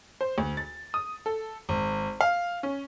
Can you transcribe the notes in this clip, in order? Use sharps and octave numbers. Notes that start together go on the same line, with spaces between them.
C5
D2
A6
D#6
A4
G#1
F5
C#4